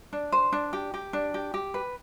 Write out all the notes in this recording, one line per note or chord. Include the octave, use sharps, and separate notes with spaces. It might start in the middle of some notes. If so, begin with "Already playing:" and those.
D4
C5
D4
G4
G4
D4
G4
G4
B4